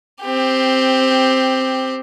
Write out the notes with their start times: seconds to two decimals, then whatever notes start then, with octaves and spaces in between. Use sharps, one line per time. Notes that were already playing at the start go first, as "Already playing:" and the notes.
0.22 C4 G4